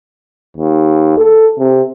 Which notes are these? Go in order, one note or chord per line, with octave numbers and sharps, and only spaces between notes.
D#2
A4
C3